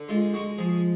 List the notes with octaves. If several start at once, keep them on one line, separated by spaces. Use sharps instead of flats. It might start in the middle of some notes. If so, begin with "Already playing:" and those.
Already playing: D3
G#3 F4
G#3 F#4
F3 G#4